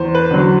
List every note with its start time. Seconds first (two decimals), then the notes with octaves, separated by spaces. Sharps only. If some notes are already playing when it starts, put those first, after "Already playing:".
Already playing: E2 C5
0.15 B4
0.31 D3 F#3